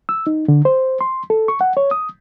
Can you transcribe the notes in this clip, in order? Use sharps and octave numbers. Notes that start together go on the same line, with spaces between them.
E6
D#4
D3
C5
C6
A4
C#6
F#5
C#5
D#6